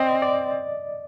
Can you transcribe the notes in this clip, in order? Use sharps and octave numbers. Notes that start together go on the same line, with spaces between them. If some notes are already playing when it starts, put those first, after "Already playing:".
Already playing: C4 D5 D#5
D5